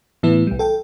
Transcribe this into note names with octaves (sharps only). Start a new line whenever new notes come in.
A2 E3 B3 E4
B1 G3
A4 G5